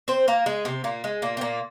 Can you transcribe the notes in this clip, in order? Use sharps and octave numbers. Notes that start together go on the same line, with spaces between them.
C4 C5
A#3 A#4
G#3 G#4
C3 C4
A#2 A#3
G#3
A#2 A#3
C4
A#2 A#3